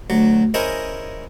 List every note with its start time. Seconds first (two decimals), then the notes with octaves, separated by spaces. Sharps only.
0.10 D2 F#3
0.54 C#4 E4 G#4 A#4 C5 D#5